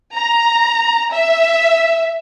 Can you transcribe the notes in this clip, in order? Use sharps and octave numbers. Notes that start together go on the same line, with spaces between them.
A#5
E5